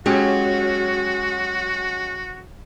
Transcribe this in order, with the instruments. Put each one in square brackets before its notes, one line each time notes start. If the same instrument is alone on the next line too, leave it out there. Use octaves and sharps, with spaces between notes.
[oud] F#3 [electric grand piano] G#3 C#4 G4 [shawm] F#4